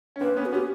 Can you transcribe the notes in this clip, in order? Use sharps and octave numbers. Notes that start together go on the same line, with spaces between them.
C#4
A#3 C4 B4
B3 C#4
F#4
B3 C#4 G4